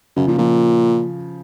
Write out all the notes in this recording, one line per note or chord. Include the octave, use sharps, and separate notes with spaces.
F#2 C#3
A#2 F3
A#2 F3